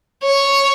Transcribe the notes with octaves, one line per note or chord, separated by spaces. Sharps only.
C#5